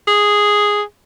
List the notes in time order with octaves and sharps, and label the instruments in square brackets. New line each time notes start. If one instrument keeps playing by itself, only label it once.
[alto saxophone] G#4